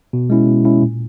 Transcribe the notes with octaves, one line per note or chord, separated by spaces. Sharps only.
B2
G#3 C#4 E4
B2
G#3 C#4 E4
A#2